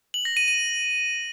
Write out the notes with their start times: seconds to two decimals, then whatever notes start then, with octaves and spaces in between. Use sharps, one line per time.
0.14 F#7
0.25 A#6
0.37 D#7
0.48 D#7